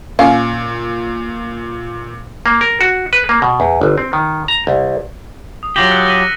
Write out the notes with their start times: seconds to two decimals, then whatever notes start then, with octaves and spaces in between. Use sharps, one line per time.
0.19 A#2 C#4 F5
2.46 A#3
2.61 A#4
2.81 F#4
3.13 B4
3.29 A#3
3.42 B2
3.60 E2
3.81 G1
3.98 C4
4.13 D#3
4.48 A#5
4.67 C2
5.63 D#6
5.76 F#3 F4 G4 A#6 F#7 G7
5.90 E6 F#6 C#7
6.07 B6 D#7 F#7